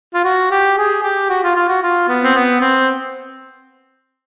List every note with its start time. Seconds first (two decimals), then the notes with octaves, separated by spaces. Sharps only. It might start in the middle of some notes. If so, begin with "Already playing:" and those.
0.14 F4
0.24 F#4
0.51 G4
0.78 G#4
1.03 G4
1.30 F#4
1.44 F4
1.56 F4
1.69 F#4
1.83 F4
2.09 B3
2.23 C4
2.35 B3
2.61 C4